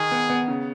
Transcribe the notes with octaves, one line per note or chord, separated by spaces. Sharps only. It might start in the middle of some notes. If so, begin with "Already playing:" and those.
Already playing: D#3 G#4
B3
B3
C#3